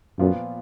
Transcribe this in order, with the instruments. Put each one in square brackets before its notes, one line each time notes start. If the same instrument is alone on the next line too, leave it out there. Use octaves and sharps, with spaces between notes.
[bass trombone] F#2 [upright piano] A#2 F3 B3 F4